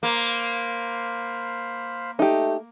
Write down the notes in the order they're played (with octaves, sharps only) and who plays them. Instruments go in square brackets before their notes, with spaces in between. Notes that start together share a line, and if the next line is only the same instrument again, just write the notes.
[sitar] A#3 [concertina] C5 F5 B5
[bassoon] A3 [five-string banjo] D#4 G4